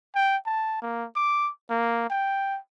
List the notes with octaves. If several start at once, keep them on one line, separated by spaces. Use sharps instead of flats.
G5
A5
A#3
D6
A#3
G5